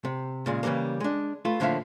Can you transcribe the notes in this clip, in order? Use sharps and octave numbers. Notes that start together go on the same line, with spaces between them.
C3
A#2 C#3 G#3
C#3 E3 G3 G#3 A#3
G#3 D4
A3 F4 B4
A2 D3 F3 A#3 E5 F5